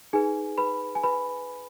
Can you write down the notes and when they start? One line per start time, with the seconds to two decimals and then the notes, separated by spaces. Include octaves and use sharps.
0.13 D#4 G#4 B4 G#5
0.58 B4 B5
0.95 G#5
1.03 B4 B5